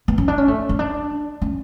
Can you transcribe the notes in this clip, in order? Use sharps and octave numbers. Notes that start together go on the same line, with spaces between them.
B3
C#4
D4
C#4
A3
C#4
D4
C#4